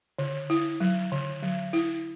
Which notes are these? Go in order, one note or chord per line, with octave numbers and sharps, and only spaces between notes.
D3
E4
F#3
D3
F#3
E4